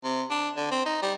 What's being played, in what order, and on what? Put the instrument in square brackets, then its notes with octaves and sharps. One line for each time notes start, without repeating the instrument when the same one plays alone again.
[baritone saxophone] C3
D4
D3
C4
D#4
G3